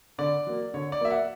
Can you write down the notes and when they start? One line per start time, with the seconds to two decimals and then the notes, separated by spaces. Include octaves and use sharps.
0.18 D3 D5
0.47 F#3 A#3
0.74 D3 C#5
0.92 D5
1.01 F#3 A#3 E5
1.10 F#5